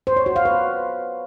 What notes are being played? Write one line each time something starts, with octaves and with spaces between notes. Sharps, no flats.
C5
C#5
F#4
F5
B4